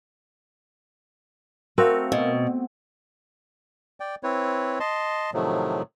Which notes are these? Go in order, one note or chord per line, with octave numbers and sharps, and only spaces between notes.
A3 C4 F#4 A#4 F5
B2
D5 G5
C4 E4 B4 C#5
D#5 A5 C6
A2 C3 D#3 F3 F#3 A3